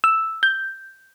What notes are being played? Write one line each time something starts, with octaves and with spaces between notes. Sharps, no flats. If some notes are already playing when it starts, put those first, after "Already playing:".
E6
G6